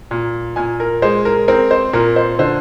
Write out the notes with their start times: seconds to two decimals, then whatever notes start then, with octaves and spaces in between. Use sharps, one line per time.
0.11 A#2
0.56 A#2 G#5
0.80 A#4
1.02 G#3 C5
1.25 A#4
1.48 C4 A#4
1.71 C5
1.93 A#2 A#4
2.16 C5
2.39 D3 C5